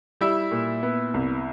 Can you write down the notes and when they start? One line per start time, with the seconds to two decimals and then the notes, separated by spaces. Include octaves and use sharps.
0.21 G3 E4 E5
0.51 A#2
0.83 B3
1.14 C2